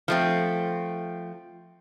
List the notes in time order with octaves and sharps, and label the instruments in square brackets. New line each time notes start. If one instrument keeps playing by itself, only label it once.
[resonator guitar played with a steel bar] F3 A3 C4